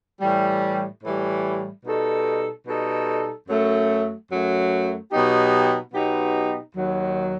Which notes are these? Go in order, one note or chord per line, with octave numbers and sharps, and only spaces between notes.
A2 E3 G3
A2 E3 G3
B2 G3 D#4 A4
B2 G3 D#4 A4
F#2 F#3 A3
F#2 F#3 A3
B2 F#3 B3 D#4 G4
B2 F#3 B3 D#4 G4
D#2 D#3 F#3